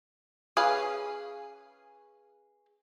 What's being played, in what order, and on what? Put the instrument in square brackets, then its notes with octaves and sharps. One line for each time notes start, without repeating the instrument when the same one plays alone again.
[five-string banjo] C#4 G#4 B4 F5 G#5